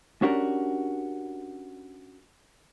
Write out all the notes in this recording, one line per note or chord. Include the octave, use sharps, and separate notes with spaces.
C#4 D4 F#4 G4 A#4